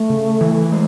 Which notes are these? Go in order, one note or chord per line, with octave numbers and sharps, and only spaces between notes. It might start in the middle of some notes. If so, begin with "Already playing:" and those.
Already playing: A3
C#3
E3
G#3